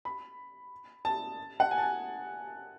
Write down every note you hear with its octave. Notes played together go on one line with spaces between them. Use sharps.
B5
A5
F#5
G#5
A5
G#5